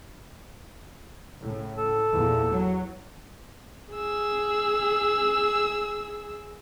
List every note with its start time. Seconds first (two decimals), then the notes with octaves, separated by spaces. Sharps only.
1.41 A2 C#3
1.77 A4
2.13 E2 A#2
2.51 F#3
3.95 G#4 E6